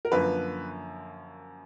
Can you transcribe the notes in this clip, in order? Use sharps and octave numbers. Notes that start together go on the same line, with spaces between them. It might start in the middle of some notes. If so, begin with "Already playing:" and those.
A#4
F#2 D3 F3 A#3 B4